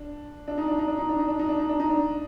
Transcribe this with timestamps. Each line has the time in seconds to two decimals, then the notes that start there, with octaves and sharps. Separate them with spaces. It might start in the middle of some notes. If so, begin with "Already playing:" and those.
Already playing: D4
0.48 D4
0.58 D#4
0.68 D4
0.79 D#4
0.88 D4
0.99 D#4
1.09 D4
1.18 D#4
1.28 D4
1.39 D#4
1.49 D4
1.59 D#4
1.69 D4
1.80 D#4
1.90 D4